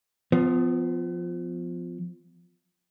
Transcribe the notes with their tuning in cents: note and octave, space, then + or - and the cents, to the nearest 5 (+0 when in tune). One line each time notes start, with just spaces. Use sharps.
F3 +0 B3 +40